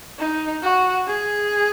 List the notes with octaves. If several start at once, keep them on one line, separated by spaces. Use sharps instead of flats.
D#4
F#4
G#4